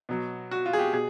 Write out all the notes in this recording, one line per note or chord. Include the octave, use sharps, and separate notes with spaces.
B2 F#3
F#4
F4
G#4
G4
B2 G#4